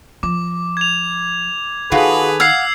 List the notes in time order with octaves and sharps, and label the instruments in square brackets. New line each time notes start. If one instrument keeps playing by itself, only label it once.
[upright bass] F3 [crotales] D6
[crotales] G#6 F7
[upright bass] D#3 [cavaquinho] F4 F#4 [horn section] G#4 A4 B4
[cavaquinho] F5 F#5 [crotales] E6 G#6 C7